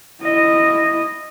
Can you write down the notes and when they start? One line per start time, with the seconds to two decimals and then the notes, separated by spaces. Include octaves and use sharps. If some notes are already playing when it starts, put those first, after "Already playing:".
0.22 E4 D#5